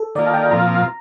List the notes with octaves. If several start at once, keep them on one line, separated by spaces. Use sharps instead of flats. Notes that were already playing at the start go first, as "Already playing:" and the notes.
Already playing: A4
D#3 A#3 F4 D5
A5
G5
A#2 F3 C4 F4 A#5